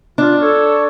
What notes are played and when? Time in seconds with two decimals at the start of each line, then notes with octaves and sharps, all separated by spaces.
0.18 D4 F4
0.42 A4 C#5